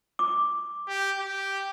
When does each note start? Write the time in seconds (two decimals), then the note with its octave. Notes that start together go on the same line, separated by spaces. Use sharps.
0.19 D6
0.88 G4
1.18 G4